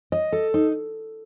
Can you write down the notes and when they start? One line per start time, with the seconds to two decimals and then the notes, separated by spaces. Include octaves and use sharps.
0.12 D#5
0.32 A4
0.54 D#4